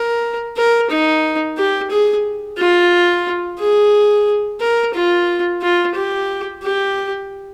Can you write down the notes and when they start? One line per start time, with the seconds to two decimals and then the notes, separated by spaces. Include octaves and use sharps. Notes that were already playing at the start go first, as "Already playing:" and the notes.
Already playing: A#4
0.57 A#4
0.90 D#4
1.57 G4
1.91 G#4
2.58 F4
3.59 G#4
4.60 A#4
4.94 F4
5.62 F4
5.95 G4
6.63 G4